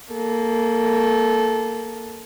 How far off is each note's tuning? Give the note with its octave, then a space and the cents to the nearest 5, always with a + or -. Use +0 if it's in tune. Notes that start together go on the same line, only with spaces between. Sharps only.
A#3 -10 A4 -20